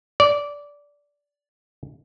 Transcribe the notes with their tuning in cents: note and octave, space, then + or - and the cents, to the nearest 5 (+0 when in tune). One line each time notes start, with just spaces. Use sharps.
D5 -15